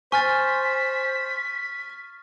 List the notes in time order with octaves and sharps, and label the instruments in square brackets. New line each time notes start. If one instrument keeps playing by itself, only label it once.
[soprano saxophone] C5 [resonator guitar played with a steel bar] G#5 [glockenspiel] C#6 F6 A6 [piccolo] B6